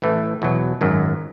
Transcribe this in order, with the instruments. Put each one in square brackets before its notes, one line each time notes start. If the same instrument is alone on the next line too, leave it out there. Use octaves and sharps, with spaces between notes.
[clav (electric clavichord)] A1 A2 E3 A3
E2 B2 F#3
G#1 F#2 D#3 F#3